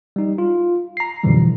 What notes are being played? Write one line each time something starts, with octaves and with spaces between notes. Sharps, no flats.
G3 D#4
F4
A#5 C7
F#2 B2 D3 E3 F3 G3